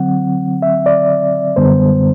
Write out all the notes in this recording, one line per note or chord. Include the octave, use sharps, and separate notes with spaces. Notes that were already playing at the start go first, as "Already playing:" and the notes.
Already playing: D3 F#3 C4 F#5
E5
D5
F#2 D3 G3 B3 C5